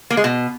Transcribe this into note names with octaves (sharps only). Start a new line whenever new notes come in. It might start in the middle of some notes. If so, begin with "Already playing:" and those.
A#3
G#3
B2